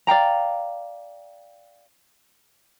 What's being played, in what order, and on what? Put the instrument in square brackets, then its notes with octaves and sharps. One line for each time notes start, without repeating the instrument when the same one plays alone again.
[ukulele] D5 F5 G5 A#5